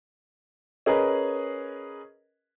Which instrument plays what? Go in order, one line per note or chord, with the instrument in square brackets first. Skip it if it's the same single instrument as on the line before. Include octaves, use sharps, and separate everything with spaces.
[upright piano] C#4 G#4 A#4 B4 D#5